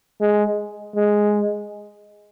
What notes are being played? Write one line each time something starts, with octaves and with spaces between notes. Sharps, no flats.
G#3
G#3